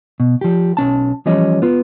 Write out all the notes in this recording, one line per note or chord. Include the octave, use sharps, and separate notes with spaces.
B2
F3 G4
B1 C#4 A5
E3 F3 G3 C#4 D#5
B3 F4